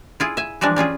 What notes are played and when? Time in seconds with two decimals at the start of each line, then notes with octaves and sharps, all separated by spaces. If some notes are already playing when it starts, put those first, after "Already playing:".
0.20 E4 F4 G#4
0.37 E5 G#5
0.61 E3 F3 G3 G#3 D4
0.76 G3 C#4 F4 G#4